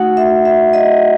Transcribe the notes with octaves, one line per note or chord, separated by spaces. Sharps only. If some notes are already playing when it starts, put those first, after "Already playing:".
Already playing: A3 D#4 F#4 F#5
E5
E5
D#5